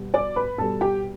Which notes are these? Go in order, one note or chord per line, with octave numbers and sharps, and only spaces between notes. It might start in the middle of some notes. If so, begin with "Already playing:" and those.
Already playing: B2 G3
D5 D6
B4 B5
B2 G3 A4 A5
G4 G5